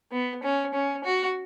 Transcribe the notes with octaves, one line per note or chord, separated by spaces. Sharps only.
B3
C#4
C#4
F#4